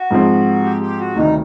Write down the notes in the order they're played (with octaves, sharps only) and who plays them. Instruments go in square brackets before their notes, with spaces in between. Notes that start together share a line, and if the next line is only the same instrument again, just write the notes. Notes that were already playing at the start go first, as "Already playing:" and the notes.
Already playing: [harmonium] F#4
[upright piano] G#2 F3 G#3 C4
[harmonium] G4
G4
F#4
[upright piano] D2 C3 D#3 G3 [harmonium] D#4